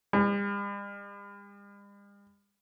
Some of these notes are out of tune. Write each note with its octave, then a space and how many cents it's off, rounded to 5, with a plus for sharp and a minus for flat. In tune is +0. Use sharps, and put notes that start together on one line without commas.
G3 +45